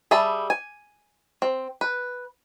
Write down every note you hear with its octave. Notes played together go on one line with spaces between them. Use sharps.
G3 G#4 E5 A5 B5
G#5
C4
B4